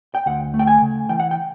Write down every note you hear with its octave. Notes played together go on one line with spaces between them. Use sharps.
G5
D2 F#5
A3
G5
G#5
C#3
E3 G5
F#5
G5